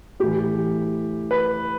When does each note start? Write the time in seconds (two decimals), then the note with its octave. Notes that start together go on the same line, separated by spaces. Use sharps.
0.20 A2 E3 G4
1.31 B4